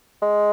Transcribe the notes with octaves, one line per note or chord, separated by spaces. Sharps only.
G#3